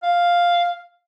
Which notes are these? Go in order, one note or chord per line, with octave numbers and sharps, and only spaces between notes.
F5